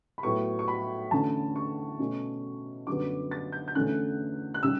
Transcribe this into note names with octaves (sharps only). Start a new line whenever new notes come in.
B5
A2 F#3 B3 C#6
C#6
B5
E2 D3 A3 C#4 A5
C#6
B2 A3 C#4
F#2 D3 G3 B3 D6
A6
G6
G6
E2 D3 A3 C#4 F#6
F#6
C#3 G3 E6